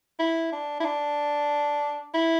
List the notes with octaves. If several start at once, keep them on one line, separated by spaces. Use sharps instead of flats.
E4
D4
E4
D4
E4